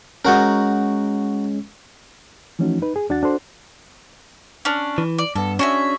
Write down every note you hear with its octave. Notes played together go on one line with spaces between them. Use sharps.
G#3 C#4 D#4 F#4 A#4
E3 F3 A3 C#4 D#4 F#4
D#4 B4
G#4
D#2 D4 F#4 F#5 A6
D4 F#4 A4 C5 C6
C#4 D4
E3
D5
G2 B3 A4
C#4 D4 F#4 G#4 E5